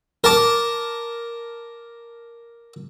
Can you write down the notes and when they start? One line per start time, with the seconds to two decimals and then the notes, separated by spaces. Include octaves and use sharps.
0.24 A#4 A5 D6